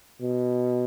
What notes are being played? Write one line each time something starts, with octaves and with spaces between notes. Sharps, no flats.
B2